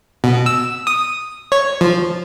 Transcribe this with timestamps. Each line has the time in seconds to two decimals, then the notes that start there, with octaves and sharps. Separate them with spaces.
0.24 B2
0.46 E6
0.87 D#6
1.52 C#5
1.81 F3